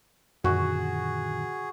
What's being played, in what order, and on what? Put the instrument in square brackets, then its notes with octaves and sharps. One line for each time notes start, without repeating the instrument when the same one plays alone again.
[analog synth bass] F#2 [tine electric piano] A#2 D3 D#3 [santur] F#4 [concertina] G#4